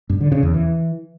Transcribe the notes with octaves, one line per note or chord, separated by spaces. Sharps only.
G2
D3
C#3
E2
E3